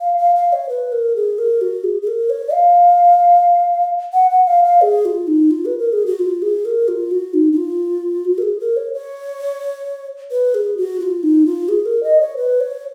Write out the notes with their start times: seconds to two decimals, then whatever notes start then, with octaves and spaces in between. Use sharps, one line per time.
0.01 F5
0.17 F5
0.36 F5
0.53 C#5
0.69 B4
0.92 A#4
1.16 G#4
1.38 A#4
1.61 F#4
1.84 G#4
2.02 G#4
2.07 A#4
2.30 C#5
2.53 F5
4.13 F#5
4.30 F#5
4.47 F5
4.64 F5
4.82 G#4
5.05 F4
5.27 D#4
5.51 F4
5.65 B4
5.78 A#4
5.93 G#4
6.06 F#4
6.19 F4
6.42 G#4
6.65 A#4
6.88 F4
7.11 F#4
7.34 D#4
7.52 D#4
7.57 F4
8.25 F#4
8.38 A#4
8.42 G#4
8.60 A#4
8.77 C#5
8.94 C#5
10.31 B4
10.54 G#4
10.77 F#4
11.00 F4
11.23 D#4
11.46 F4
11.68 G#4
11.86 A#4
12.03 D#5
12.21 C#5
12.37 B4
12.60 C#5